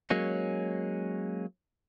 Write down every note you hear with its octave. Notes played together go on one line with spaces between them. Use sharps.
F#3 G#3 A#3 C#4